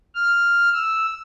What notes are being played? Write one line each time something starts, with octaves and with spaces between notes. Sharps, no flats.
F6
E6